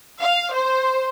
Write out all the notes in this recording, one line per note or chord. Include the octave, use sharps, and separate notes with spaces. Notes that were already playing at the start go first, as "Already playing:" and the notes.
F5
C5